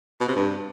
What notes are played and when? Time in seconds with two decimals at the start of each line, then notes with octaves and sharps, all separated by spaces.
0.20 B2
0.28 C3
0.36 G2